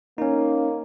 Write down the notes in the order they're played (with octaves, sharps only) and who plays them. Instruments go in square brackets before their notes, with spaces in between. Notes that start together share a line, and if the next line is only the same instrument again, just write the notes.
[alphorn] A#3 [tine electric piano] C#4 D#4